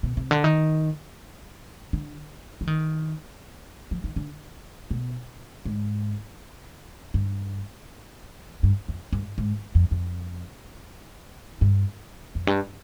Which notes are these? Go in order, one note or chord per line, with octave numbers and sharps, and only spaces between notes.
B2
C3
D3
D#3
D3
F3
D#3
F3
D#3
D3
B2
G#2
G2
G2
F2
G2
G#2
F2
F2
G2
F2
G2